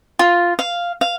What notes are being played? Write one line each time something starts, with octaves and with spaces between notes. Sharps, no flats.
F4
F5
F5